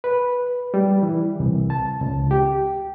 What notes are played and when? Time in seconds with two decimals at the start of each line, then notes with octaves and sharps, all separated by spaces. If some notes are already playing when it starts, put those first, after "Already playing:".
0.04 B4
0.74 G3
1.03 E3
1.40 C2
1.70 A5
2.01 C#2
2.31 G4